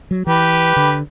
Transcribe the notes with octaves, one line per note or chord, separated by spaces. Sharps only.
F#3
E3 G4 B4
D3